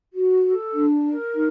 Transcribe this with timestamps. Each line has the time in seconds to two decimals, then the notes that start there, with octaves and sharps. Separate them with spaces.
0.13 F#4
0.45 A4
0.73 D4
1.04 A#4
1.35 D#4